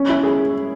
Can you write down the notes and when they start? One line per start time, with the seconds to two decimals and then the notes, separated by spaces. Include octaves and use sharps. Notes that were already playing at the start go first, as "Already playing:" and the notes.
Already playing: C#4
0.09 E4
0.23 G#4